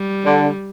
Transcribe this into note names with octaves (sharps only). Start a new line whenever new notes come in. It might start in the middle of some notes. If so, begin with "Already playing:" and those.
Already playing: G3
D3